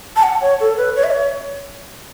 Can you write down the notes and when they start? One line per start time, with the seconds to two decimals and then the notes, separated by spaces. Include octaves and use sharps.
0.16 A5
0.23 F#5
0.41 C#5
0.60 A4
0.78 B4
0.96 C#5
1.04 E5
1.11 C#5